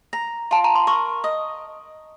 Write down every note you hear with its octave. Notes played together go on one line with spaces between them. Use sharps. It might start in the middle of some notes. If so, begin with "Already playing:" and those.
A#5
F4 A5
A#5
C6
A#4 C#6
D#5